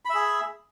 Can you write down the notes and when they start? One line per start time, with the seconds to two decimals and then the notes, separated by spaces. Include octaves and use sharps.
0.05 B5
0.10 E5
0.14 G#4